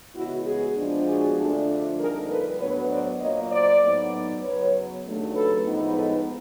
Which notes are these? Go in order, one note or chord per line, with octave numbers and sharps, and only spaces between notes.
C#3 E3 G#3 B3 E4 F#4
F#4 G#4
A#2 F3 G#3 B3 D4
F#4 G#4
F2 D3 F3 A3 D4
F2 D3 G3 A#3 D#4 G#4 A#4
A4 B4
A2 F#3 B3 D4 B4 C#5
C5 D5
A#2 F#3 A#3 C#5 D#5
C5 D5
A2 F#3 B3 D#4
F#2 C#3 F#3 B3 B4 C#5
D#2 C#3 F#3 A3 D4
A4 B4
A2 F3 G#3 B3 D#4
A4 B4